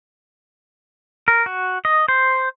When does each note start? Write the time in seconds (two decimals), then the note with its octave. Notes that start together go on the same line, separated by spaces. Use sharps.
1.28 A#4
1.46 F#4
1.85 D#5
2.08 C5